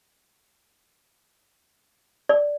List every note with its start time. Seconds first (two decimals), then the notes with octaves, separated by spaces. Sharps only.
2.29 D5